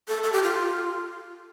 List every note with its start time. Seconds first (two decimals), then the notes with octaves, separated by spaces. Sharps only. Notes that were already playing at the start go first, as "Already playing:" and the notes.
0.08 A4
0.24 A4
0.33 G4
0.43 F4